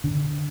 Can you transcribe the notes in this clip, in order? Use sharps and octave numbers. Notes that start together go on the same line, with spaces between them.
D3